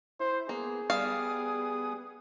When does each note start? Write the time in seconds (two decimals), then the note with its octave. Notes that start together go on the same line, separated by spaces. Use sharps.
0.20 E4 C5
0.49 A#3 B3 G#4
0.90 G3 B3 F5 D#6